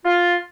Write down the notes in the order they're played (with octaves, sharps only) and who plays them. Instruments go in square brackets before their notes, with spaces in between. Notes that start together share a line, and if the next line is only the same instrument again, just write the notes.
[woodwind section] F4